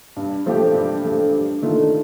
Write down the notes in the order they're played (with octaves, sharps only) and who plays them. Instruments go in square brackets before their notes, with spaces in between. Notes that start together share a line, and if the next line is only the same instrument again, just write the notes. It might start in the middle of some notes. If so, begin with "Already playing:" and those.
[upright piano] G2
F3 A3 D4 G4
G2
F3 A3 D4 G4
G2
D#3 A3 D4 F4